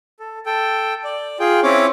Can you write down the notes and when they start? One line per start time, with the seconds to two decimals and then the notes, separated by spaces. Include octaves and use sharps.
0.20 A4
0.46 A4 G5
1.04 D5
1.40 F4 G#4 G5
1.63 C4 C#4 E4 C#5 D6